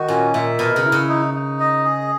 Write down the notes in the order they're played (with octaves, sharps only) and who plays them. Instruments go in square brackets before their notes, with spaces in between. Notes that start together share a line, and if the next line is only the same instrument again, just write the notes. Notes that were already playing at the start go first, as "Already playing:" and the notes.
Already playing: [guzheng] D#3 [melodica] F#4
[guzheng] A#2 [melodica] C#4
[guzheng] A#2 [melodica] E5
[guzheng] B2 [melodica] A#4
[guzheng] C#3
[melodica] E4
[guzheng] C#3
[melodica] D#4
D#4
D#5
G#4